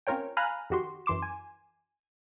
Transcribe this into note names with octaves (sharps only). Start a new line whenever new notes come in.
C4 C#4 F4 A#4 C#5 G5
F5 G#5 A#5 B5 F6 F#6
F2 D#3 F#4 G4 C6
F#2 E3 C6 D6 E7
G#5